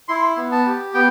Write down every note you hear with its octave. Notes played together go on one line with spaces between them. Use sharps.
E4 C6
B3
A5
G4
B3 G5